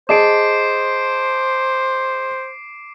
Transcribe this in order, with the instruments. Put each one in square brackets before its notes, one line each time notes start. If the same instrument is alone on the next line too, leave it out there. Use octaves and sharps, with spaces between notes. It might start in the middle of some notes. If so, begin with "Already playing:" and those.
[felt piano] G#4 D#5 A5 [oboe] C5 [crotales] D6 C7 D7